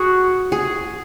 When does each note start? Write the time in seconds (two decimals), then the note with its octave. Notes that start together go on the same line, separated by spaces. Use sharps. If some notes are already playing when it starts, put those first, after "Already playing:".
Already playing: F#4 G#4
0.52 G#4